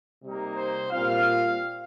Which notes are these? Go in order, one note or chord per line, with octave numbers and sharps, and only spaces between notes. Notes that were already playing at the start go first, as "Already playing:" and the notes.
C3 G3 A#3 D#4
C5
A#2 G3 C4 F4 F5